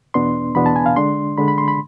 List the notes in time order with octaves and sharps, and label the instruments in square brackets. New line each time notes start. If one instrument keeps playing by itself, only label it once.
[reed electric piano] E2 B2 B3 D4 C6
E2 B2 B3 D4 B5
A5
G#5
F5
D3 G#3 D4 C6
D3 G#3 D4 B5
B5
C6
B5